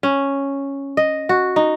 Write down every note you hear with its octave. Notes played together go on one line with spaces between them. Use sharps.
C#4
D#5
F#4
D#4